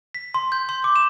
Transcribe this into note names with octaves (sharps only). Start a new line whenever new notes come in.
B6
C6
G6
C6
D6
E7